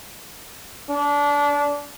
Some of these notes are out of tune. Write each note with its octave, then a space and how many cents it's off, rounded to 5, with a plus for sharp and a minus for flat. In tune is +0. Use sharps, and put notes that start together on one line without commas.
D4 -25